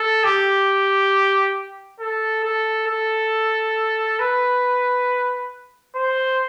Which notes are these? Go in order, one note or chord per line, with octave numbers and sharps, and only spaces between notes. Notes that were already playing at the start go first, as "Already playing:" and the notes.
Already playing: A4
G4
A4
A4
A4
B4
C5